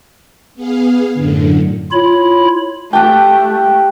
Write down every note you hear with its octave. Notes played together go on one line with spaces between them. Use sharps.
B3 G#4 F5
F#2 A2 D3
E4 F4 C#5 B5
A3 G4 F#5 G5 A5